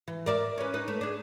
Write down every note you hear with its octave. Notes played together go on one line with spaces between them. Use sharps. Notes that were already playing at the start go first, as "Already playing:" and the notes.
E3
A#4 D5 E5
C#4 B4
D#4 B4
A3
D4 G#4